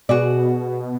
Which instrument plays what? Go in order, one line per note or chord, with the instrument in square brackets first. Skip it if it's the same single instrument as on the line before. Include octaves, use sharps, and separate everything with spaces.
[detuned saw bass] B2 [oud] F#4 G#4 D5